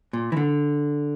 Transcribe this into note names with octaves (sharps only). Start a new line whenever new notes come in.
A#2
E3
D3